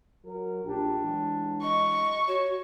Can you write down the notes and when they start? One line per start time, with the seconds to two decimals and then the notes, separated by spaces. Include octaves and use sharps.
0.25 F#3 A#4
0.65 A#1 D4 G4
1.02 E3 F#3 G#3
1.63 D#5 C#6
2.28 F#4 C#5